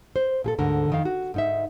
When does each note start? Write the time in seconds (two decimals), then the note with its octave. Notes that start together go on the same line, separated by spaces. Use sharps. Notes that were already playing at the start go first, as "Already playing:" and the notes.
0.16 C5
0.44 A#2 G#4 A4
0.59 D2 G#2 D3 A#4
0.90 F2 D#3 F5
1.05 F#4
1.34 G#2 D#4 E5